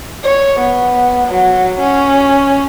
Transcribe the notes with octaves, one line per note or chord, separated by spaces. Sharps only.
C#5
B3
F#3
C#4